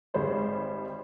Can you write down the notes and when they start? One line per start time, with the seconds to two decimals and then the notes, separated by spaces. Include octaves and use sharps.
0.14 G#1 G3 G#3 C5 C#5